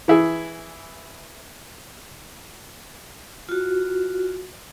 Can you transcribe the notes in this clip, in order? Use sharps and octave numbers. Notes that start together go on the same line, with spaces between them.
E3 E4 G#4
F4 F#4